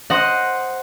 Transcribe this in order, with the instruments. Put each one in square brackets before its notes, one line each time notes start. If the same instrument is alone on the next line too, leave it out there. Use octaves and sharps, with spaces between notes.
[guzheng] C5 D#5 F#5